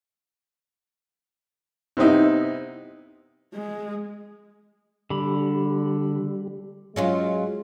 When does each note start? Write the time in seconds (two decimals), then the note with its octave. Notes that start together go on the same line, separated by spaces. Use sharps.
1.97 C3 B3 C4 D#4 E4
3.54 G#3
5.10 D3 G3 B5
6.96 F#3 G#3 C#4 F4